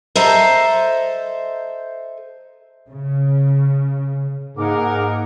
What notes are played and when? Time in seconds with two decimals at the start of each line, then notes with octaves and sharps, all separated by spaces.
0.15 A4 C5 D#5 E5 A5 A#5
2.90 C#3
4.57 G#2 A#3 D#4 G#4 A#4 F#5 D6